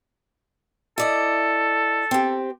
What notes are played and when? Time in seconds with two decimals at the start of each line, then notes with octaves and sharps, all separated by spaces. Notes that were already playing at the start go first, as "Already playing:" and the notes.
0.98 E4 A4 D5 D#5
2.11 C4 G4